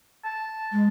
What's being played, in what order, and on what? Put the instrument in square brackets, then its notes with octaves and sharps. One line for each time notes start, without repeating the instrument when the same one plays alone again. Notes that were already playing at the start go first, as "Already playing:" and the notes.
[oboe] A5
[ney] G#3